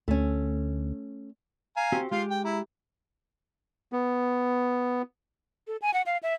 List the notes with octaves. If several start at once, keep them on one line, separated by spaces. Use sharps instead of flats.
D2 A3 C#4
F5 G#5 A#5
C4 F#4 G4
G#3 F4 G4 F5
G5
E4 A#5
B3
A4
G#5
F#5
F5
E5